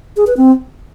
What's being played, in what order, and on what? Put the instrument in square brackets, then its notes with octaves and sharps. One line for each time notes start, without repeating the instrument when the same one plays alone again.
[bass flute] G#4
B4
C4